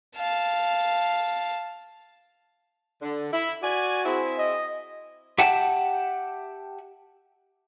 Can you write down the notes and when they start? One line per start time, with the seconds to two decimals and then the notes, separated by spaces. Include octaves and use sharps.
0.16 F5 A5
3.02 D3
3.32 E4
3.63 F#4 D5 G#5
4.05 C4 E4 G#4
4.38 D#5
5.38 G4 E5 F#5 G5 A5